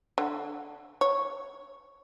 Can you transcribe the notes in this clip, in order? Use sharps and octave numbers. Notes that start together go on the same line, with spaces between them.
D3
C#5